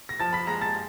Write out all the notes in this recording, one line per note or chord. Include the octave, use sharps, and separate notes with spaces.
A#6
F3 A5 A6
B5 B6
G#3 A#5 A#6
A5 A6